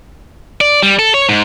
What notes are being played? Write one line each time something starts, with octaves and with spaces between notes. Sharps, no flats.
D5
G3
A4
C#5
G#2